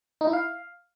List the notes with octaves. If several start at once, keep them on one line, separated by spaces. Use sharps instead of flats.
D#4
E4
F5